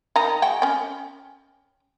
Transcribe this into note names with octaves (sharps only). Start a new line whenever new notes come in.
D#3 D#4 A#5
G#3 F#4 G5
C#4 G5